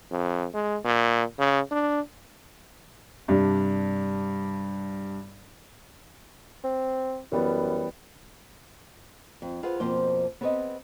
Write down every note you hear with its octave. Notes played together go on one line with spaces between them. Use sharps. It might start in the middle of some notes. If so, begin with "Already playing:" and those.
F2
G#3
A#2
C#3
D4
G2 C3 G3 D4
C4
F#2 E3 G3 B3
F2
F4 G#4 B4 C5 F#5
F2 B2 F3 A#3 C5
B3 C4 G#4 B4 C#5 D#5